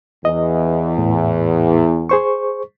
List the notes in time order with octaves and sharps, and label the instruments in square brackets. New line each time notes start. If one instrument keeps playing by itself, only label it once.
[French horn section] E2 [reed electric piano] D#5
[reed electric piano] A2
G#4 C5 C#6